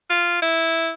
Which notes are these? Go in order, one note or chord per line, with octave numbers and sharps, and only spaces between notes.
F4
E4